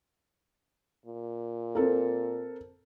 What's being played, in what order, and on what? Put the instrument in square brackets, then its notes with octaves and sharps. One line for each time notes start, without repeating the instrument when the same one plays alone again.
[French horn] A#2
[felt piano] C4 A4 A#4